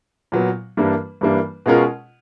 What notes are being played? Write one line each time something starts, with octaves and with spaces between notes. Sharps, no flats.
A#2 F#3 B3
G2 E3 G3 A#3 D4
G2 E3 G3 A#3 D4
B2 G#3 C#4 F4 A#4